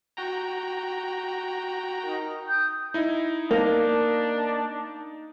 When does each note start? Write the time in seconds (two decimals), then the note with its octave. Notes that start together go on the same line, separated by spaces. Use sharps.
0.17 F#4 G5 A#5
2.03 D#4 A#4
2.48 G5 D#6 G6
2.94 D#4 E4
3.51 A#3 D4 D#4